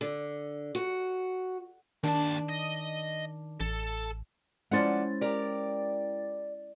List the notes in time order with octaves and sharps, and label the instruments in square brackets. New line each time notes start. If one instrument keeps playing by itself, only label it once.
[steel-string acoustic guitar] D3
F#4
[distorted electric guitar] D#2 A5 [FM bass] D#3 [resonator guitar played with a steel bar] D4
[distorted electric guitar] D#5
[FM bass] A1 [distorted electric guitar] A4
[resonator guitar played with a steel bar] F3 D5 F#5 [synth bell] G#3 E4 A6 [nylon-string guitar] C#4 C5
[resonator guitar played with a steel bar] G4 A#4 [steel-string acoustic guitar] D5